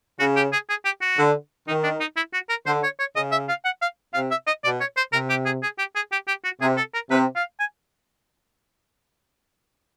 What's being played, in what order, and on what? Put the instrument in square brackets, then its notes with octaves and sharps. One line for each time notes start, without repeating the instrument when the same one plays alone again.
[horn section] C#3 [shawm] F#4
[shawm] G4
G#4
G#4
G4
F#4
[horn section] D3
[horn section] D#3 [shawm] D#4
[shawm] D4
D#4
E4
F#4
A#4
[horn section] D3 [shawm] C5
[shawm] C#5
C#5
[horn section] C#3 [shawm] D#5
[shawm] E5
F5
F#5
F5
[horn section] C3 [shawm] F5
[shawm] E5
D#5
[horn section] B2 [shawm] D5
[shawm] C#5
C5
[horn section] C3 [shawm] A#4
[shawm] G4
G#4
G#4
G4
G#4
G4
G4
F#4
[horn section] C3 [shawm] G#4
[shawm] A4
A#4
[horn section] C3 [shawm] B4
[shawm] F5
G#5